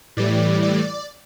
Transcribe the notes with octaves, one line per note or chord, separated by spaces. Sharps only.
A2 E3 G3 D5
D5